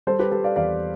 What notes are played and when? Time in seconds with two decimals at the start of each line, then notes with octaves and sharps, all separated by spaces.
0.07 G3 A4 C5
0.19 G4 B4
0.32 G3 A4
0.44 D5 F5
0.56 E2 D5 F5